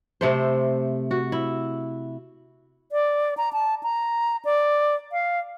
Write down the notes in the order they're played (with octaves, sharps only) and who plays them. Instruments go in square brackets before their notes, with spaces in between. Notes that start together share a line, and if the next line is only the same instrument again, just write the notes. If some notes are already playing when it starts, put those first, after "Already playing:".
[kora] C3 A3 C5
F#4
E4
[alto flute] D5
A#5
A5
A#5
D5
F5